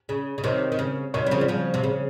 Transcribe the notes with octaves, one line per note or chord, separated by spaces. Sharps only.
C#3
C#3
C3 D#3 C#5
D#3
C#3
C3 D#3 C#5
G3
C#3 F3
G3
C#3 F3
C3
C#3